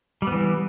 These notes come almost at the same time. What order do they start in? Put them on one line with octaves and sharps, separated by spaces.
G3 B3 E3